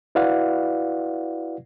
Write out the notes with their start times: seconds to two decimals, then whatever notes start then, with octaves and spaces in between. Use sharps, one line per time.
0.15 E4 F#4 B4 D5 F5 F#5